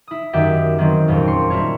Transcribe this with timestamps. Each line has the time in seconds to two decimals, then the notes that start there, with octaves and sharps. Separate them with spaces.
0.08 E4 D#6
0.33 F#2 D#3 G4 E5 F#5 E7
0.78 D#3 F#3 B3 C4 G4
1.08 F#1 F2 A#2 C#4 G5
1.27 C6 C7 C#7
1.50 G3 A#3 E4 F4 C#5